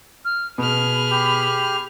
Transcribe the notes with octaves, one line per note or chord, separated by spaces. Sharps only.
F6
B2 G#4 B5 F6
G4